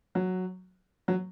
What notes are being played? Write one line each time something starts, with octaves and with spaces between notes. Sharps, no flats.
F#3
F#3